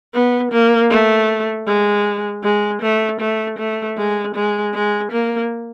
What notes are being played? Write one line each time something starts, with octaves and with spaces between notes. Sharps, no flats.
B3
A#3
A3
G#3
G#3
A3
A3
A3
G#3
G#3
G#3
A#3